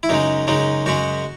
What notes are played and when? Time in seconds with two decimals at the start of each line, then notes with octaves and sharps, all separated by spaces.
0.03 E4
0.09 F#2 C#3 G#3 D#4
0.47 F#2 C#3 G#3 D#4
0.86 F#2 C#3 G#3 F#4